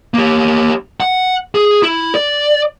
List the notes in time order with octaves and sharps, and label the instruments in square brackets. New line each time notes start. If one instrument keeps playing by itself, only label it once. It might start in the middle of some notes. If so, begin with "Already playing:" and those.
[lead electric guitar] A#3 G4
F#5
G#4
E4
D5